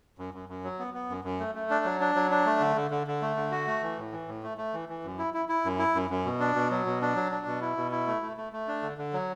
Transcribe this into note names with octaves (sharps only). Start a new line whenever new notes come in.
F#2
F#2
F#2
F#3
B3
B3
F#2
F#2
A3
A3
D4
F#3
D4
F#3
D4
A3
D3
D3
D3
D3
A3
D3
F#4
A3
E3
A2
E3
A2
A3
A3
E3
E3
F#2
E4
E4
E4
F#2
E4
F#2
F#2
B2
D4
B2
F#3
B2
D4
F#3
D4
B2
E4
B2
E4
A3
A3
A3
A3
D4
D3
D3
F#3